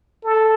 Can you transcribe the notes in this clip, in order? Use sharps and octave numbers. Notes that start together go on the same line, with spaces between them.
A4